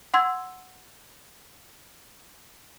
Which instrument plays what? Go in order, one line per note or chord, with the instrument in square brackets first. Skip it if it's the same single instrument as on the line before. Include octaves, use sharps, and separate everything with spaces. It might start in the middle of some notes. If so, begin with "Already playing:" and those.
[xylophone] F#5 C6 E6 G#6